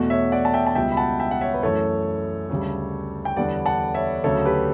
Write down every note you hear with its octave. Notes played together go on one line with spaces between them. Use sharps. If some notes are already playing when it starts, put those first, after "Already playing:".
Already playing: E2 B2 A3 F#4
C#5 E5
D5 F#5
A5
E5 G5
A5
C#2 B2 G3 E5 G5
B5
F#5 A5
E5 G5
F#5
C#5 E5
B4
F#2 E3 A3 A4 C#5
D2 C#3 G3
G5
E2 D3 G3 B3 D5 F#5
F#5 A5
C#5 E5
D2 C#3 F#3 A3 A4 C#5
G4 B4